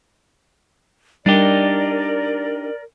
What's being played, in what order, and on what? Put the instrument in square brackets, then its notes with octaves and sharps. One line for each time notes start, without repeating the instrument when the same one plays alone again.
[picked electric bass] G3 [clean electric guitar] D4 D#4 G4 [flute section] A#4 D5